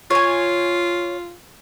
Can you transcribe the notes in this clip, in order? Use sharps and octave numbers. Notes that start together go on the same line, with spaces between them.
F4 C#5 G#5